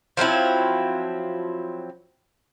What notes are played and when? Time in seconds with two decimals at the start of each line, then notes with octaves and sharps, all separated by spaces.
0.17 F3 F#3 C4 E4